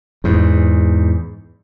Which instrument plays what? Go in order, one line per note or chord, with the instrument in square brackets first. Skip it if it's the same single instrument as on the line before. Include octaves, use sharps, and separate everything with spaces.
[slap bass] E2 G#2